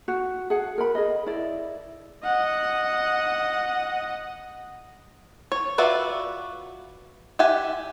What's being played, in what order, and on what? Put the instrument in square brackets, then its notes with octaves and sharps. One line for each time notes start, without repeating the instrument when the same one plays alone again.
[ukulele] F#4
G#4 F#5
A#4 B5
G#4 D#5
E4 D5
[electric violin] D#5 F#5
[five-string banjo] C#5
F4 F#4 B4 D5 E5
G4 E5 F#5 G#5